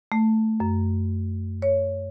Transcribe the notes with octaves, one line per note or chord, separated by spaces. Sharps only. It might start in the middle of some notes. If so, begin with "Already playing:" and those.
A3
F#2
C#5